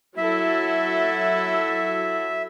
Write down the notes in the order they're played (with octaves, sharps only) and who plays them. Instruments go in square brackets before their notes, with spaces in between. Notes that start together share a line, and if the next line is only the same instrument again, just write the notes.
[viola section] F#3 E4 A4 [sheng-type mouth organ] E5